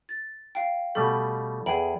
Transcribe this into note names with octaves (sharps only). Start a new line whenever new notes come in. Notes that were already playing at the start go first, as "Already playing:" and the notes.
A6
F5 G5
B2 G3 A3 A4
E2 G#4 G5 B5